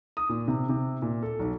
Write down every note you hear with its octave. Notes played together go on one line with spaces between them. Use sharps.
D#6
A#2
C3
C3
A#2
A4
B1